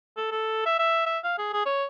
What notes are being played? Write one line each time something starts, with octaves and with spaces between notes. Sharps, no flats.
A4
A4
E5
E5
E5
F5
G#4
G#4
C#5